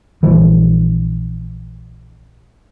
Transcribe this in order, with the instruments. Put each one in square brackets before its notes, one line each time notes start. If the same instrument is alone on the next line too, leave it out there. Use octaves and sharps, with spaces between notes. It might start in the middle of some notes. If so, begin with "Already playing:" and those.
[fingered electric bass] A#1 E3 G3